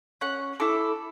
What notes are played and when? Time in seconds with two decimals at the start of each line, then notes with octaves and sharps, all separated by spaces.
0.21 C#4 F#5
0.60 E4 A4 D6